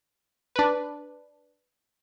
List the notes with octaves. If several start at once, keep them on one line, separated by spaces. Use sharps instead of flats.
D4 B4